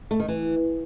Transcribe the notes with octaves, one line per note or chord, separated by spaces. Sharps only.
A3
D#3
E3